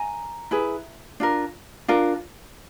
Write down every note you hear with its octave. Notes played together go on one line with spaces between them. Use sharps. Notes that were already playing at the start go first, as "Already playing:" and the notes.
Already playing: G#5 A#5
E4 G#4 B4
D4 F4 A#4
D4 F4 A#4